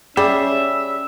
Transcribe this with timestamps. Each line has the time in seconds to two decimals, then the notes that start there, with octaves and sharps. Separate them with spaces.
0.17 G3 C#4 G#4 E5